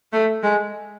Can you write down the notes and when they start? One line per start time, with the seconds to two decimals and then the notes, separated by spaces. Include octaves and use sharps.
0.13 A3
0.43 G#3